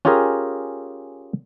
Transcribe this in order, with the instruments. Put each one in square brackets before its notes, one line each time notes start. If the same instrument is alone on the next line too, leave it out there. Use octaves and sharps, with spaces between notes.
[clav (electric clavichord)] C#4 F4 G4 G#4 A#4